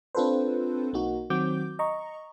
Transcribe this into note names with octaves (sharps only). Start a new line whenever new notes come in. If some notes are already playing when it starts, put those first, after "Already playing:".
C4 D4 F4 A4 B4 C5
B1 A#3 D#4 F#4
D#3 F#3 C4 F#4 D6 G6
D#5 A#5 C#6